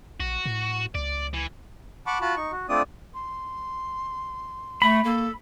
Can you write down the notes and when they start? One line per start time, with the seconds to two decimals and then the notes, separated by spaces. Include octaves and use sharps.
0.20 A#1 F#4
0.46 A2
0.95 C#2 D5
1.33 E3
2.07 F#5 A5 B5 C#6 D6
2.21 F4 F#4 A5 B5
2.36 D#4 C#6
2.52 F#4
2.69 A3 C4 D4 F4 D5 D#6
3.13 C6
4.82 A3 B5
5.04 A#3 A4